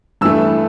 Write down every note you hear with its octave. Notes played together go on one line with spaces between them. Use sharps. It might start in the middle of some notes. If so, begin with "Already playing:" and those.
G2 E3 A3 E6